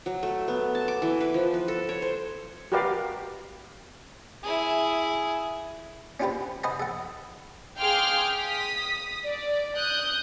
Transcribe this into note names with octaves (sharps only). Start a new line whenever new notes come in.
F#3
A3
B3
A5
D6
E3
B4
F3
B4
A4
C#5
C5
F#4 G4 A#4 B4 D5 F5
E4 G#4
C#4 D4 F4 G4 B4 C5
B4 C5 D#5 F#5 G#5 A#5
A4 F#5
G#4 F5 G5 C6 D6 F6
D#6 B6
D5
D#6 F#6 G6